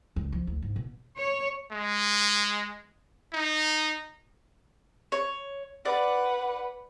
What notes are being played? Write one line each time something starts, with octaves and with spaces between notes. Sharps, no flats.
C#2
F3
D2
G#2
B2
C#5
G#3
D#4
C#5
B4 D5 F#5